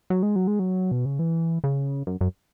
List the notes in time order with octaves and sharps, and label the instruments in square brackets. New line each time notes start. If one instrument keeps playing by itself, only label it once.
[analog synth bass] F#3
G#3
F#3
G#3
F#3
B2
C#3
E3
C#3
F#2
F#2